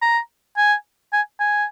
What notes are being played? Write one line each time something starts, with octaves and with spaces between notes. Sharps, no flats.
A#5
G#5
G#5
G#5